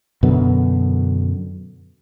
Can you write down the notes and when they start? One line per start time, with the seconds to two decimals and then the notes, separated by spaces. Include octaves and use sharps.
0.23 F#2 B2 D3 B3